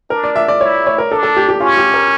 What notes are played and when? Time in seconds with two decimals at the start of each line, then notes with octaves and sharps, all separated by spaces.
0.10 D4 A#4
0.24 D5
0.36 E5
0.48 D5
0.61 E4 C#5
0.87 C#5
0.98 A#4
1.11 D4 A4
1.23 A4
1.37 G4
1.49 G4
1.60 C#4 F4
1.78 G4
1.94 A#4